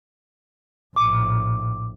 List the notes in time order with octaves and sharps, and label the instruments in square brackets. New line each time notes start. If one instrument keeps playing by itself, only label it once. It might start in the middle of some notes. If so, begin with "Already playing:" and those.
[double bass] A#1 A2 [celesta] D6